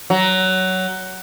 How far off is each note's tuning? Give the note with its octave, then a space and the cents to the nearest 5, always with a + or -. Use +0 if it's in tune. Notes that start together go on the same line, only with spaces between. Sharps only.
F#3 +15